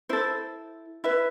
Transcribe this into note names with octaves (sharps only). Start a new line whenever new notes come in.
E4 A4 C5
E4 B4 E5